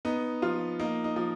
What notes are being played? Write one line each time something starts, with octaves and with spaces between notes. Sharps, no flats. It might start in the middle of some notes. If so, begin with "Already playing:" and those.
B3 D#4
F3 F4
A#3 D#4
D#4
F3